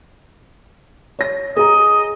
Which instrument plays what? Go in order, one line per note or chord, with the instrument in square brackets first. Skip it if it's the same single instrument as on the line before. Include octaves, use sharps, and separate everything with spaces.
[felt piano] C#5 A#6
[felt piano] G#4 A#5 [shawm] D#5